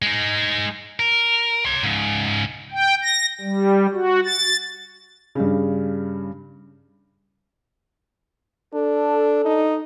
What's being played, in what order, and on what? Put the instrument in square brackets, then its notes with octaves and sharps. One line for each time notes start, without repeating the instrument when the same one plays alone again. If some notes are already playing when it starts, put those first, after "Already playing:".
[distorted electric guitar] G#3 D#4
A#4
C#5 C6
G#2 C#3
[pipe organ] G5
A#6
G3
F#4
A6
[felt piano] G2 C#3
[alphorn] D4 [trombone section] A4
[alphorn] D#4